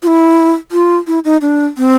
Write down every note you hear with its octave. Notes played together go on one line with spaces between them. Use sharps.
F4
E4
F4
E4
D#4
D4
C4